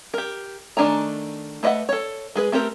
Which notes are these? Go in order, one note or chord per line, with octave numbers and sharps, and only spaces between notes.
G4 A#4
D#3 A3 D4 G#5 A#5
A3 B4 D#5 E5 F#5
A4 C#5
G#3 G#4 B4
A3 C4 G4 A#4